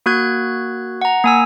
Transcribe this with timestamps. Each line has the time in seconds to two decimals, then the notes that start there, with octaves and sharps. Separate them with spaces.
0.06 A#3 F#4 F#6 G#6
1.01 F#5 A#5
1.24 A#3 G#5 E6